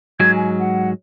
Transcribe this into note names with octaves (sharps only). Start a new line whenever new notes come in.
G#2 F#3 G#3 G#6
G#5
F#5